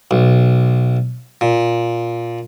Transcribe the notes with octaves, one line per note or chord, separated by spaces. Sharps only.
B1
A#2